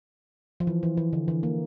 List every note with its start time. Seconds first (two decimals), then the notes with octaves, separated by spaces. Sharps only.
0.60 F3
0.67 E3
0.83 E3
0.97 E3
1.13 D3
1.28 E3
1.43 A#3